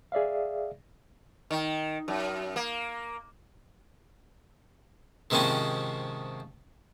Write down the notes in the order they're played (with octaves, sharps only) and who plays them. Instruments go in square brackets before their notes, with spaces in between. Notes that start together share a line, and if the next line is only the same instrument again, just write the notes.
[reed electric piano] G#4 D5 E5 F5
[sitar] D#3
F#2
A#3
[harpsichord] G#2 C3 D#3 F3 C4 C#4